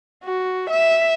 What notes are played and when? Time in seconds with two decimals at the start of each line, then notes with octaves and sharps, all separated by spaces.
0.24 F#4
0.70 E5